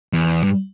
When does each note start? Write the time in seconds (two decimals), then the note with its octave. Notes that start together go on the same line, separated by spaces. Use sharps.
0.13 E2
0.44 G2